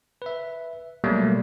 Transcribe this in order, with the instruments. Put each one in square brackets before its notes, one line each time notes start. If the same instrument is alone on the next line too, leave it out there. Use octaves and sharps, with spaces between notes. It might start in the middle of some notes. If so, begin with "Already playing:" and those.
[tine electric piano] B4 E5
B2 F#3 G3 A3 A#3